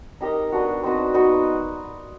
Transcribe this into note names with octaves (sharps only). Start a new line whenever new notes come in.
D#4 G4 A#4 D#5
B3 D4 F#4
C4 D#4 F#4 B4
B3 D#4 F#4